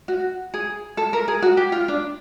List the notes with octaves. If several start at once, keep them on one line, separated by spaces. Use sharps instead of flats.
F#4
G#4
A4
A#4
G#4
F#4
G4
F4
D4